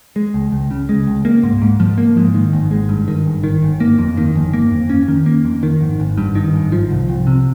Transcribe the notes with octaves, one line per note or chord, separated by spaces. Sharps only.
G#3
C#2
C#2
C#3
G#3
C#2
A#3
G#2
G#2
F3
A#3
G#2
D#3
G#1
G#3
G2
D#3
G#1
D#3
G1
A#3
F2
D#3
G1
A#3
F2
C#4
D#3
A#3
F2
D#3
G#1
G#1
G2
D#3
G#1
F3
C2
C2
C3